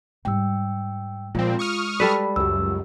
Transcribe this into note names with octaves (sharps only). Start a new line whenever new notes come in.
G#2 G3 G5 E6
A#2 F3 G#3 C4 F4
C#6 D#6 F6
G3 A4 B4 D5 B5
C#2 F#2 G4 E6